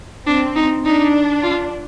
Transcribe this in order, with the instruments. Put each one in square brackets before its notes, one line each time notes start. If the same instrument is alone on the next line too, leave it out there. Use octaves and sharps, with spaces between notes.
[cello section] C4 [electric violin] D4
[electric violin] D#4
[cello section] D4 [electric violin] D#4
[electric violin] F4